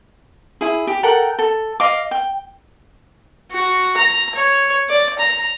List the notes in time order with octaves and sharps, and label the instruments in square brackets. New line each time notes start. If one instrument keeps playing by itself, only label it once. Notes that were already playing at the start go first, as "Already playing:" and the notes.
[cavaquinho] E4 G#4
G4
A4 A#4 F#5 G5
A4
D#5 F5 D6
G5
[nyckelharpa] F#4
A#5
C#5
D5
A#5